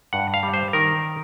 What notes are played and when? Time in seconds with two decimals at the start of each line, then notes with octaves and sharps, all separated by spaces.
0.13 G2 F#5
0.34 F5
0.43 G3
0.54 C5
0.73 D#3 A#4